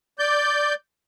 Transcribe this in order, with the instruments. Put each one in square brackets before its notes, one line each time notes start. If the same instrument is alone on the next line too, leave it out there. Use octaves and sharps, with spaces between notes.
[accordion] D5 G6